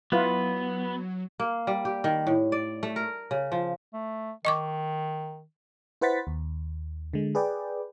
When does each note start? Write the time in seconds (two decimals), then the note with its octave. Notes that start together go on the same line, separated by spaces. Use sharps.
0.12 F#3 B3 E4 F4 B4
1.40 A#3
1.67 G3
1.85 G4
2.04 D#3
2.27 A2
2.52 D5
2.83 A3
2.96 A#4
3.31 C#3
3.52 F3
3.94 A3
4.45 D#3 D#5 C#6 D6
6.01 E4 B4 C5 F#5 A6 B6
6.27 D#2
7.13 D3 G#3
7.35 G#4 B4 D5 G5